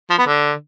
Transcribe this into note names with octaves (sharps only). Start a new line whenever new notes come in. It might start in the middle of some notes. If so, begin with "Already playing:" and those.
F3
B3
D3